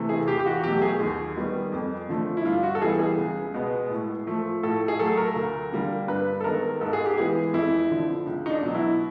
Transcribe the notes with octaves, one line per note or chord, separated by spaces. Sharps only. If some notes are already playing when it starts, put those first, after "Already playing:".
Already playing: C3 E3 A3
G#4
E2 G4
G4
F#4
B2 F#3 A3 G4
G#4
D#2
D#3 G3 B3
F2
D3 F3 A3
E4
G2 F4
F#4
A4
E3 G3 B3 G#4
G#4
C#2
B2 G#3 B3
A2
F3 A3
A2 A4
G#4
F#3 A3 A4
A#4
D2
D3 G3 A#3
G2 B4
A4
D#3 G#3 B3 A#4
G#2 A4
G#4
G4
E3 G#3 B3 G#4
F2 E4
D3 F3
C#2
D#4
D4
B2 F#3
E4